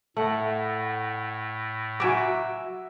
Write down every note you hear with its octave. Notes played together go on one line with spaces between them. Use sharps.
A2 A3 F#5
F#3 F#4 E5 G#5 D6